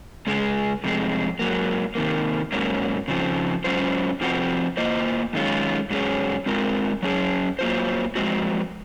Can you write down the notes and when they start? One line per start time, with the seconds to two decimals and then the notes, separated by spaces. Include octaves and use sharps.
0.27 C#3 G#3 C#4 G#4
0.84 F2 C3 G#3
1.39 G#2 F#3 A#3
1.95 C3 D#3 A#3
2.52 G#2 F#3 A#3 C#4
3.08 C#3 F3 C4
3.64 G#2 F#3 C#4 F4 C5
4.21 F2 C3 F3 C4 F#4
4.77 A#3 F4 C5 D#5
5.33 F#2 D#3 G#3 C#4 F4
5.90 G#2 F#3 C#4 G#4 C#5
6.46 G#3 C4 F4 A#4
7.03 F#3 C#4 G#4
7.59 F#3 A#3 F4 C5
8.16 F2 D#3 G#3 C4 F#4